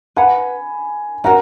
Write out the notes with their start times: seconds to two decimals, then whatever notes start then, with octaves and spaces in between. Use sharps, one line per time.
0.16 B4 F#5 G#5 A#5 B5
1.24 C#4 F#4 A#4 F#5 A#5